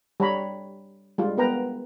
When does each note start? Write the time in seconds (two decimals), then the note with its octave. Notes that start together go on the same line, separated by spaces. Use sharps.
0.20 G3 C#5 A#5 B5
1.18 G3 G#3 F4
1.37 B3 A#4 B4 G5 A#5